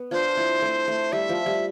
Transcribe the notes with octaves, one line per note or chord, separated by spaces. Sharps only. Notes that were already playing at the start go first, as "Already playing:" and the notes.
Already playing: B3
D4 F4 C5
C4 E4
A3 C4
A3
G3 E5
F3
G3